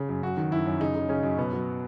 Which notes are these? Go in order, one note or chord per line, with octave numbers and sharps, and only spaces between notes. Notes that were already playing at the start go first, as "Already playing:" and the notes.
Already playing: C#3
F#2
F#2 F#4
D#3
F#2 E4
F#2
C#3 D#4
C#3
C#3 C#4
F#2
B2 B3
F#3